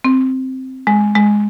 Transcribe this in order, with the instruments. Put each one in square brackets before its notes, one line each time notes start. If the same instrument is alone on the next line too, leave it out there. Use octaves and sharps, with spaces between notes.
[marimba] C4
G#3
G#3